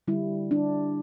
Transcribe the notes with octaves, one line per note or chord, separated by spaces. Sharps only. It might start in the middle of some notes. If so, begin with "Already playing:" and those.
D3 G3 E4
D4